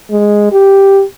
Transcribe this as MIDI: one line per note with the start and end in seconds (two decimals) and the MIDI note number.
0.11 0.49 56
0.52 1.03 67